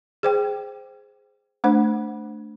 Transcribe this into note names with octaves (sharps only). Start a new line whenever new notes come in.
G#4 C5 G5
A3 D4 C5 F#5